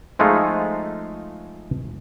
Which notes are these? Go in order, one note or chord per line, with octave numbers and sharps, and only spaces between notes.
F3 G#3 A3 D#4 F4